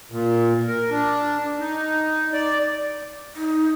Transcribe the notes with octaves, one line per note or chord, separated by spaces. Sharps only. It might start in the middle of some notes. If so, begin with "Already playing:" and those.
A#2
A#4
D4
D#4
D5
D#4